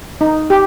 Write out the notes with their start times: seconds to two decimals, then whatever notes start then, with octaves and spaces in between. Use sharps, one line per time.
0.21 D#4
0.50 G4